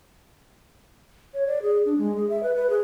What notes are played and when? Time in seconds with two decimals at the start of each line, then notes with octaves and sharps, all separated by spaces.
1.34 C#5
1.47 D5
1.62 G#4
1.85 D4
1.98 G#3
2.17 G#4
2.30 E5
2.43 B4
2.55 B4
2.70 G#4